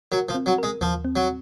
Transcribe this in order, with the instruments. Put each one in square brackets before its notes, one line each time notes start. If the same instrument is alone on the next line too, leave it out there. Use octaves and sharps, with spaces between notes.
[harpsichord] F#3 [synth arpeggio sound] A#4
[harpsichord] F3
[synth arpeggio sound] C4
[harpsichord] F#3
[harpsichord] G#3 [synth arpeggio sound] A#4
[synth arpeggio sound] D#2 [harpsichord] F3
[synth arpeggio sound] C4
[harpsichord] F#3